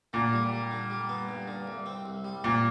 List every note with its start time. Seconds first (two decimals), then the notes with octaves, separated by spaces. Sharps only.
0.13 A#2 D3
0.32 G3
0.52 G3
0.71 D3
0.90 G3
1.09 B3
1.29 G2
1.48 D3
1.67 C2
1.86 C4
2.06 C2
2.25 G3
2.44 A#2 C4